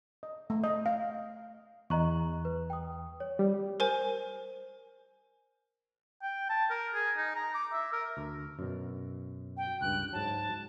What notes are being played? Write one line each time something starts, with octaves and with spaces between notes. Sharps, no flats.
D#5
A3
D#5
F5
E2 D#5 A#5 C#6 F#6
B4
G5 D#6
C#5
G3
A#4 C5 G#5
G5
A5
A#4
G#4
D#4
A#5
D6
E5
A#4
D2
F#2 B2
G5
C#2 G2 F#6
G#2 F#3 A5